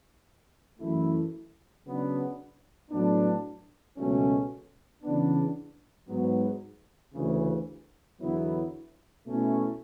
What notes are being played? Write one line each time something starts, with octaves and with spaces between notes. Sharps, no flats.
F#2 E3 A3 E4
C#3 F#3 B3 D4
A2 F#3 B3 D4
C#2 B2 F#3 A3 C#4
C#3 E3 B3 D4
G#2 F#3 B3
D2 C#3 E3
E2 D3 F#3 B3 E4
B2 A3 C#4 E4